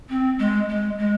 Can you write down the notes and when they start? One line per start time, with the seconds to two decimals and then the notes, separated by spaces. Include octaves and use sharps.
0.09 C4
0.39 G#3
0.69 G#3
0.98 G#3